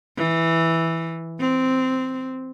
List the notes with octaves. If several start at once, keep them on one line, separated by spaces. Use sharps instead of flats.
E3
C4